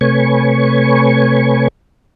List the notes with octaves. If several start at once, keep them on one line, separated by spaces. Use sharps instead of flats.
C3 A3 B4 C#5 G#5 C#6